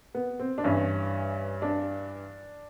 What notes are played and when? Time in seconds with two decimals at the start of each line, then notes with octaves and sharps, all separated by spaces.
0.15 B3
0.39 C4
0.58 D4
0.64 G2 E3 C#4
1.62 D4